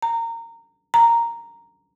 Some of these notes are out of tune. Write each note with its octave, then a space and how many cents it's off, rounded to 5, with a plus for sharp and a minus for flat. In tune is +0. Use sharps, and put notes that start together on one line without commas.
A#5 -20
A#5 -5